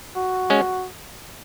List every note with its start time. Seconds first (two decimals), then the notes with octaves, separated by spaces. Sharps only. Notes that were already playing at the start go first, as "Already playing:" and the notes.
0.16 F#4
0.50 G#3 C#4